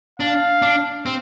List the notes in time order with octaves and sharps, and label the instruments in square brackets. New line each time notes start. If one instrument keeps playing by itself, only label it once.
[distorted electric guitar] D4 [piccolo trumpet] F5
[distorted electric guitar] D4
C4